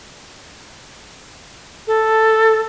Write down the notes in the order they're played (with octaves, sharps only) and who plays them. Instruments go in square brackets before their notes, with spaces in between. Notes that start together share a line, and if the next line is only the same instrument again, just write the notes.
[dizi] A4